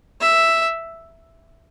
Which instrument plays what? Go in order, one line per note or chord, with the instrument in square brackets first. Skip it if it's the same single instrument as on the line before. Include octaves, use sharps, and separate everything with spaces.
[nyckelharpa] E5